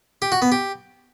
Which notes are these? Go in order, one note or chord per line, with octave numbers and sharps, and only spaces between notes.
G4
F#4
B3
G4